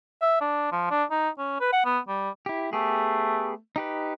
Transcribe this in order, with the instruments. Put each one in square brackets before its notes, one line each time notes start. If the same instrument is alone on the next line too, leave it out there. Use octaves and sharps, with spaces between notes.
[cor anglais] E5
D4
F3
D4
D#4
C#4
B4
F#5
B3
G3
[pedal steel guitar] E4 G4
[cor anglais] A3 [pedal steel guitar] B3 G4 G#4
[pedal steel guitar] D#4 G4 B4